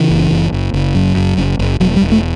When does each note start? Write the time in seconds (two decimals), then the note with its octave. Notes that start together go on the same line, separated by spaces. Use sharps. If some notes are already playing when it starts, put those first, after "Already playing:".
Already playing: C#3 E3
0.10 F#1
0.31 F#1
0.52 F#1
0.73 F#1
0.95 F#2
1.16 F#1
1.37 F#1
1.59 F#1
1.80 E1 F#3
1.96 G3
2.02 E1
2.12 A3